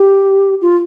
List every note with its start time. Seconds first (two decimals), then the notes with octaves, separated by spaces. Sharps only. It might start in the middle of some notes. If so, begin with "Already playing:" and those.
Already playing: G4
0.61 F4